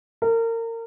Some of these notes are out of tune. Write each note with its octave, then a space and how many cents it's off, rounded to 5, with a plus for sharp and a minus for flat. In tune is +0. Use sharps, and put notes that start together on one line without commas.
A#4 -30